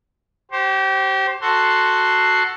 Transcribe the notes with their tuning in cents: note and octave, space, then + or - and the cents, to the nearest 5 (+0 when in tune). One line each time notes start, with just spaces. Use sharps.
G4 -30 C5 +15
F#4 +0 A4 +10 C6 +0